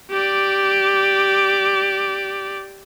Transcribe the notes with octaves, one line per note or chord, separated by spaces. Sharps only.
G4 D5